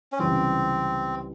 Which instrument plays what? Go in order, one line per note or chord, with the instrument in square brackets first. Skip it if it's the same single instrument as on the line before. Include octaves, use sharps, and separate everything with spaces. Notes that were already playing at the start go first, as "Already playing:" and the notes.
[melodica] C#4
[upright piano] C#2 C3 E3 G3 [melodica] C4